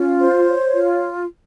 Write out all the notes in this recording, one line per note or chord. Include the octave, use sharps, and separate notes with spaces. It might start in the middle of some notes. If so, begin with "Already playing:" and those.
Already playing: C#4 F4
C5
C#5
F4